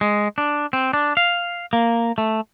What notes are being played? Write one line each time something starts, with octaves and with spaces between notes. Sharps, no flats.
G#3
D4
C4
D4
F5
A#3
A3